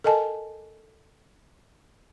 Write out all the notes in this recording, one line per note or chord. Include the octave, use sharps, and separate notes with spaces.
A4 A#4 D#5 G#5 A5